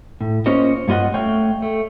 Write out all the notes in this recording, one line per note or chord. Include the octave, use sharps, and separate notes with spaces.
A2
A#3 C#4 F4 C5 C#5 D#5
G2 A#3 F4 D#5 F#5
A3 C#5 F5 G5
A3